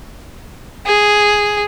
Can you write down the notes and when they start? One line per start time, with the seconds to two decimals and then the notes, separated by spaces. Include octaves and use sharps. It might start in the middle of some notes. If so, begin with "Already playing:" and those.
0.86 G#4